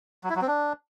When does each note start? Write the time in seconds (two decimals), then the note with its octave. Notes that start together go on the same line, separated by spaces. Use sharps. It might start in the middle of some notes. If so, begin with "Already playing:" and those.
0.24 F#3
0.30 E4
0.36 F#3
0.42 C4
0.48 D4